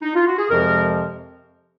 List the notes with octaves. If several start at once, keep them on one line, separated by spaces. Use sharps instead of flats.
D#4
F4
F#4
G#4
F2 C3 F3 G#3 A#4